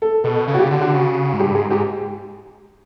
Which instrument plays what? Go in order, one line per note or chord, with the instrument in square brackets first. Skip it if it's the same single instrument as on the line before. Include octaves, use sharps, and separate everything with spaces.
[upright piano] A4
[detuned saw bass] B2 [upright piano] A4
[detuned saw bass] C#3
[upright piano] F#4
G4
[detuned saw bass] D3 [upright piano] F#4
[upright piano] F#4
[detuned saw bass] C#3
G#2
[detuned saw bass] G2 [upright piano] G4
[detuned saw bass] G#2 [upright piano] G#4
[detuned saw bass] G#2 [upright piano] G4